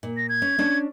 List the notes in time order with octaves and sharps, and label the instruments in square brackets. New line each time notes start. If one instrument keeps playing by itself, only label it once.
[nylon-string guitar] A#2
[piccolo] A#6
G#6
[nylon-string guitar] C#4
C#4 D4